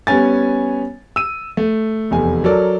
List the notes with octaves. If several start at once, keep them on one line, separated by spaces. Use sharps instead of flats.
G3 B3 C#4 G#5 A6
E6 D#7
A3
F1 E2 G#5
F#3 A4 A#4 D5